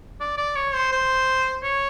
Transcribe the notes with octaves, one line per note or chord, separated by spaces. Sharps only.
D5
D5
C#5
C5
C5
C#5